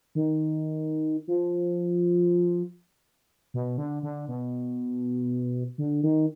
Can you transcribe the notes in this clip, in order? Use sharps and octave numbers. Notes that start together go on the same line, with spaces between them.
D#3
F3
B2
D3
D3
B2
D3
D#3